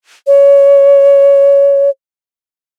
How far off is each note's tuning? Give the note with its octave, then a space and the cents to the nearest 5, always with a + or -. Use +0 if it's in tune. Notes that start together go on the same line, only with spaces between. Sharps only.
C#5 +15